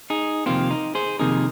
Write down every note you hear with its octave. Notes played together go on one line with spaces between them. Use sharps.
D#4 G#4
F2 C3 D#3 A#3 C4 F4
D#4
G#4 C5
F2 C3 D#3 A#3 D#4 G#4